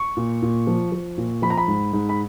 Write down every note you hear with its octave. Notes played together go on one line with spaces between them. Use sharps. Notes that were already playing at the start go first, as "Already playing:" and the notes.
Already playing: C#6
A#2
A#2
F3
F3
A#2
F3 B5
A#5
B5
G#2
G#2
B5